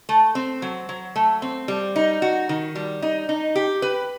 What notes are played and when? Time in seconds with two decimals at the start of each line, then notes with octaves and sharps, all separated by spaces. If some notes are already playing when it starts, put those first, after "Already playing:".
0.09 A3
0.35 C4
0.62 F#3
0.89 F#3
1.16 A3
1.42 C4
1.68 G3
1.96 D#4
2.22 F#4
2.49 D#3
2.75 G3
3.02 D#4
3.29 D#4
3.56 G4
3.82 B4